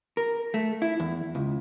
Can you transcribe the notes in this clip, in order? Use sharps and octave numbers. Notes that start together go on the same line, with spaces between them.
A#4
A3
E4
E2
C#2